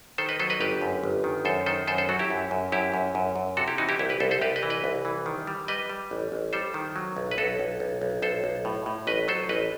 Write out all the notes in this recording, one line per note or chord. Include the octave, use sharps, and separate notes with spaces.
D#3 A4 C5
B4 D#5
F#3 A4 C5
B4 D#5
G1 G4 B4
F#2
G1
D#3
F#2 A4 C5
D#3 A4 C5
F#2 A4 C5
A4 C5
F#3 F#4 A4
E4 G4
F#2
F#2
F#2 E4 G4
F#2
F#2
F#2
C3 F#4 A4
E4 G4
E3 D#4 F#4
E4 G4
C2 E4 G4
G4 B4
C2 A4 C5
A4 C5
C2 G4 B4
B4 D#5
E3
B4 D#5
C2
E3
D#3
G3
G3 B4 D#5
G3
A1
A1
G3 A4 C5
D#3
F#3
B1
B4
B1 F#4 A4
B1
B1
B1
B1 A4 C5
B1
A2
A2
A1 B4 D#5
F#3 A4 C5
A1 B4 D#5